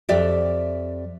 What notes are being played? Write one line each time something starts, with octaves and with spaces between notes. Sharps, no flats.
F2 G4 D5 E5 G5